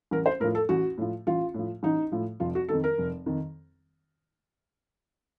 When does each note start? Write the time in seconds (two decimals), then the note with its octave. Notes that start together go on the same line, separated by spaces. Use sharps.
0.11 A1 A#4
0.26 C5
0.40 A2 A#4
0.44 F3
0.55 A4
0.69 A1 F#4
0.98 A2 F3
1.27 A1 F4
1.54 A2 F3
1.83 A1 D#4
2.12 A2 F3
2.40 F1 F4
2.55 F#4
2.68 F2 D#3 A4
2.84 A#4
2.98 F1
3.26 F2 D#3